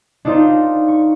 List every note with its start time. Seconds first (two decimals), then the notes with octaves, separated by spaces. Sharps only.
0.25 D4 D#4 F4 A#4 C5
0.88 C#6